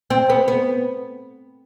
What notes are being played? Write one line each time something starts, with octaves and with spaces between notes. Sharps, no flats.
C4
B3
B3